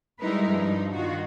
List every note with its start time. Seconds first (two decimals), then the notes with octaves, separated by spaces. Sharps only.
0.19 G3 G#3 D#4 E4 A#4 B4
0.50 G2 F3 D#4
0.92 D#3 F4 F#4